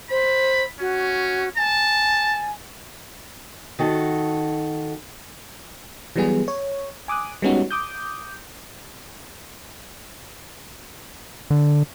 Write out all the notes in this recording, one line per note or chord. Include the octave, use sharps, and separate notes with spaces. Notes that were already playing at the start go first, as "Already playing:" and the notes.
C5 B5
C#4 F#4
G#5 A5
D#3 F#4 A4
E3 F#3 G3 B3 G#4
C#5
G#5 D6 D#6 F#6
G3 G#3 B3 C#4 D#4 F#4
D6 D#6 G6
D3